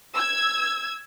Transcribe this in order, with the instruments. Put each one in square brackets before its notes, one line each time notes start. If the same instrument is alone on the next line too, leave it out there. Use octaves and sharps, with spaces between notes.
[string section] E6 G#6